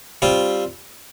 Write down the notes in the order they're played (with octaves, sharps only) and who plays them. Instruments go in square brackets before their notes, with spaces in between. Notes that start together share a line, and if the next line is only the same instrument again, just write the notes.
[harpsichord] G3 C4 F4